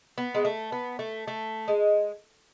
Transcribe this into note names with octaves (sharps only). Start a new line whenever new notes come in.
B3
G#3
A3
B3
A3
A3
G#3